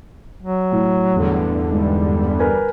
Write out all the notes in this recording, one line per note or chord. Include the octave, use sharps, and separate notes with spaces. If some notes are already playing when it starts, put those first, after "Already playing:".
F#3
A2
E2 G2 D3
G#2 G3
A#4 B4 G#5